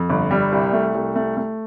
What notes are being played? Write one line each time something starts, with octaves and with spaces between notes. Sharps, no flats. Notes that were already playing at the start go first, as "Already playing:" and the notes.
Already playing: F2
G1
G3
C2
A3
C2
A3
A3